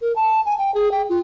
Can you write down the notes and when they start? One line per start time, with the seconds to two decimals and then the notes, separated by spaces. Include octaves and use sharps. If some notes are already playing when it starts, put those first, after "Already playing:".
0.01 A#4
0.16 A5
0.46 G#5
0.58 G5
0.74 G#4
0.91 G5
1.09 F4